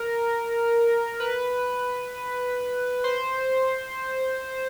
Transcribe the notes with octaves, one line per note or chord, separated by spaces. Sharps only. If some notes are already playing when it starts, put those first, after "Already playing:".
Already playing: A#4
B4
C5